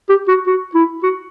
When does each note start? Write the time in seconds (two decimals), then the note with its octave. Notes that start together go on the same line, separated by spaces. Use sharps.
0.09 G4
0.28 F#4
0.47 F#4
0.75 E4
1.03 F#4